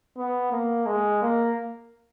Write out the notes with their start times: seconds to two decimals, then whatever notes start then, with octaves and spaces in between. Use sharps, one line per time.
0.17 B3
0.52 A#3
0.86 G#3
1.22 A#3